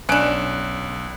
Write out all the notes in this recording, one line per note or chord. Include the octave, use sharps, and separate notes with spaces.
B1 C#4 D4 F#6 D7